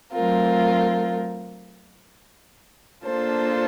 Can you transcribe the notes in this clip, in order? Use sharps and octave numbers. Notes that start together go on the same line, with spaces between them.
F#3 A3 C4 F4 A#4
A#3 D4 F4 A4 C5